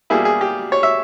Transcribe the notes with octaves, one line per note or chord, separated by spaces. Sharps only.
B2 G3 A#3 E4 G#4
G#4
G4
C#5
E5